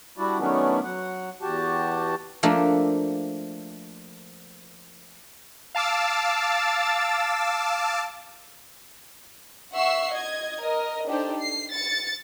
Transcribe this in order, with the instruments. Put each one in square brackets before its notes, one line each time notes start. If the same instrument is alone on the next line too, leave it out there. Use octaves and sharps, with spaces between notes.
[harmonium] G3 D4 E4 F#4 D5
D#3 F#3 A3 B3 C#4 D4
F#3 F#5
E2 F#4 G4 A5
[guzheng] F3 A3 A#3 D4
[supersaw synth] F5 A5 D6 E6 A6
[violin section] E5 F#5 C#6 E6 C7
D#5 G#6
A#4 D#5
D4 D#4 G4 A4 C5
C7
A6 C#7